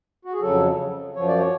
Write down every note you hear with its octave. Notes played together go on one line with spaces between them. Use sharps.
F#4
G#4
F2 C#3 F#3 A4
F#2 F3 C#5
D5
C#5